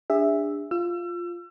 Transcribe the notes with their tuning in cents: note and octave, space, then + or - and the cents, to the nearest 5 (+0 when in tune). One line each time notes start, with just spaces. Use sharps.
D4 +0 G#4 -35 E5 +0
F4 +0 E6 +35